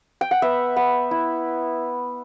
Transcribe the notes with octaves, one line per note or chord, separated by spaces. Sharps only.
G5
F#5
B3 E5
B3
E4